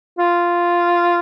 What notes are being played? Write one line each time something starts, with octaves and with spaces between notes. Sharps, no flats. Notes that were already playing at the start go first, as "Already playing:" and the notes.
F4